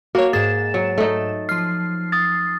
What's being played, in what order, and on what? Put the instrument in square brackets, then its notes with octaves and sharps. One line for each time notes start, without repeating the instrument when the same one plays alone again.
[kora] A#3 [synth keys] F#4 C#5
[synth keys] G#2 E7 [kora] G#4 [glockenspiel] A6
[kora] F#3
A3 D#4
[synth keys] F3 C7 [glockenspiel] F6
[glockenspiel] D#6 A6